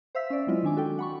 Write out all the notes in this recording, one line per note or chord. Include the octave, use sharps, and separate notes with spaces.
C5 E5 F5 E6 B6
C#4 D5
F#3 G#3 C4 E4 F4 D#5
D#3 D4 G#5 D6
F#4 A4 G5
F#5 B5 C#6